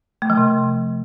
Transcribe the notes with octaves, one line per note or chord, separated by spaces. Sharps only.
A3
F3
C3